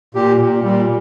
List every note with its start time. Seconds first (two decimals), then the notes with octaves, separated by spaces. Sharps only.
0.15 A#2 G4
0.40 A#2
0.64 A#2 G3